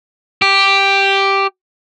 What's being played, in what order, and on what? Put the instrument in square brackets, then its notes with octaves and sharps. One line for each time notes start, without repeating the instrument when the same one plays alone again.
[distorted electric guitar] G4